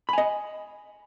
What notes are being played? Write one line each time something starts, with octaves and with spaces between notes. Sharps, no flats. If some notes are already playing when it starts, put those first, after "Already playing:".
D#5 G#5 B5